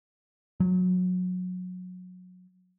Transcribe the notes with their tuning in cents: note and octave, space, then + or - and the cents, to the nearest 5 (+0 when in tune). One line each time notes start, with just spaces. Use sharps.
F#3 -25